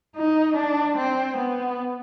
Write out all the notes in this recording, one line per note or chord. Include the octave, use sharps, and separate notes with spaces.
D#4
D4
C4
B3